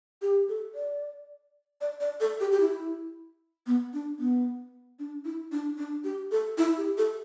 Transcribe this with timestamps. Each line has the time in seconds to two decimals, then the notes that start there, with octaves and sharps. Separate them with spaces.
0.22 G4
0.49 A4
0.75 D5
1.81 D5
2.00 D5
2.20 A4
2.40 G4
2.52 G4
2.60 E4
3.67 B3
3.94 D4
4.19 B3
4.99 D4
5.25 E4
5.52 D4
5.78 D4
6.04 G4
6.31 A4
6.58 E4
6.77 G4
6.98 A4